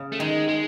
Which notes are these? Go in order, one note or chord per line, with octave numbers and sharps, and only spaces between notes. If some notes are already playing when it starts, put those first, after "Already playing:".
Already playing: C#3
A3
D#3 G#3
G#3